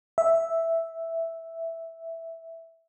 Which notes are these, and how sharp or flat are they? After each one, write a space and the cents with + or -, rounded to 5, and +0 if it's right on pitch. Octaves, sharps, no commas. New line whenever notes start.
E5 +0